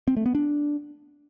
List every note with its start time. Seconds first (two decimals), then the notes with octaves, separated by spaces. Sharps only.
0.08 C4
0.17 A3
0.26 B3
0.35 D4